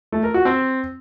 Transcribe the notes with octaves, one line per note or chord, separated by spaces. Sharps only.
A3
A#4
F#4
C4